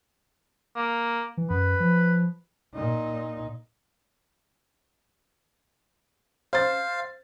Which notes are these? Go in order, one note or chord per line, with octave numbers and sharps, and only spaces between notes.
A#3
E3
F#2 B4
F3
A#2 D#4
C5 F5 A6